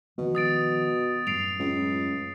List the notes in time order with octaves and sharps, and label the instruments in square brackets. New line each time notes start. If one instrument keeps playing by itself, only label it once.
[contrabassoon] B2 [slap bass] D#3 F3 G#3
[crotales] D#6 A6 D7
[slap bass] F#2 A2 G3 [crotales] C7 D7 F7
[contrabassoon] C#2